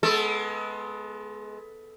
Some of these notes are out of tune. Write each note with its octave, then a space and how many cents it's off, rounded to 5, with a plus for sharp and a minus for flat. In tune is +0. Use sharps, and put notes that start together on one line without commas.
G#3 +25 B3 +0 A4 +0